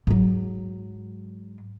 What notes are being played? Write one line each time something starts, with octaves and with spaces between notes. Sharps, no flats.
G#2 F#3